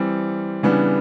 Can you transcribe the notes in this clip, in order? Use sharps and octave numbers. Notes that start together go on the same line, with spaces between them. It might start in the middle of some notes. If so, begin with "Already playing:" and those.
Already playing: E3 G3 C4
C#3 E3 G3 B3 D4